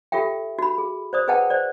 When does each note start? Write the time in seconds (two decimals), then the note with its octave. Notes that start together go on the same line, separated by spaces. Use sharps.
0.12 F4 G4 A4 E5 G5
0.59 F#4 B5
0.78 G#4
1.13 C5 D5 D#6
1.28 G#4 B4 D#5 F#5 G5 A5
1.50 C5 D5